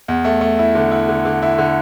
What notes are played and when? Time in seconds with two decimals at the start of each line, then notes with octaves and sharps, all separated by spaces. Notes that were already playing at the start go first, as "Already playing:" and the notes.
0.08 E2
0.25 A3
0.41 A3
0.59 E4
0.75 D3
0.92 E4
1.09 D3
1.25 D3
1.42 E4
1.58 D3